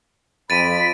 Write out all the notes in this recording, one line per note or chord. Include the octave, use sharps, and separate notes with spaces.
F2 B5 A6 D7 D#7